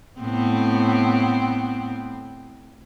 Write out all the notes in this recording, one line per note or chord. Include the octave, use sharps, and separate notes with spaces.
A2 B3 C4